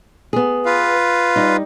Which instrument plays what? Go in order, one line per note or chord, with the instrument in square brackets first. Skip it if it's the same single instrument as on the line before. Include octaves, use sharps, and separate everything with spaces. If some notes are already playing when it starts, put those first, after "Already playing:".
[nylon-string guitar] B3 G#4
[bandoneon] F4 B4 F5
[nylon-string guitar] G3 D#4